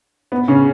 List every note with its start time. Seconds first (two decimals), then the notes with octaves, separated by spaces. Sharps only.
0.32 B3
0.48 C#3 C#4